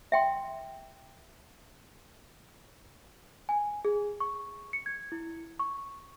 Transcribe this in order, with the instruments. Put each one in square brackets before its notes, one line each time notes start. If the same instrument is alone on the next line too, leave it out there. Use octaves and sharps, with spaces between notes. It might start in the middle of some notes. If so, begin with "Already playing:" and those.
[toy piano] E5 G5 C6
[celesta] G#5
G#4
C#6
C#7
G#6
E4
C#6